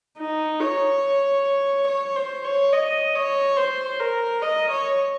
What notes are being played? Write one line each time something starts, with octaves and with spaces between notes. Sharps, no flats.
D#4
C#5
C#5
C5
C#5
D#5
C#5
C5
A#4
D#5
C#5